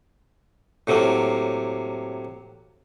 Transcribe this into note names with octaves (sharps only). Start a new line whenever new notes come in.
A2 C3 F#3 A#3